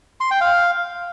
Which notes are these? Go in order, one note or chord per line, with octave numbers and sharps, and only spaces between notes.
C6
G5
F5